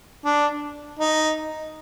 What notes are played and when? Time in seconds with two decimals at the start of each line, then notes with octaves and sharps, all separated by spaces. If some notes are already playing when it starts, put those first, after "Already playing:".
0.25 D4
0.99 D#4